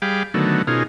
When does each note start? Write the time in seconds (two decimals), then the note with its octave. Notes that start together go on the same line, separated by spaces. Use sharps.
0.02 G3 G#4 F5 G5 B5 D6
0.34 D3 D#3 F#3 A3 B3
0.67 B2 C#4 D#4 F4 G#4 A#4